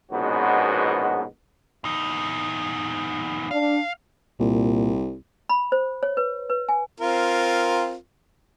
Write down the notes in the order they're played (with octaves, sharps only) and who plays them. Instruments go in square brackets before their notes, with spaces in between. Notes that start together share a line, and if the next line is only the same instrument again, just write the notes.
[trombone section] A#1 G#2 B2 B3 C#4 F#4
[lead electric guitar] E2 D#4
[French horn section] D4 [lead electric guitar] F5
[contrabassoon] C2 [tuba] A#2
[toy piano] B5
C5
C#5
B4
B4
G#5
[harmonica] C4 F4 A#4